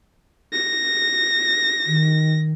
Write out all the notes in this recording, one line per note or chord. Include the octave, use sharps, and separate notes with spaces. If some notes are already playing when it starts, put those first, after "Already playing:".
A#6
D#3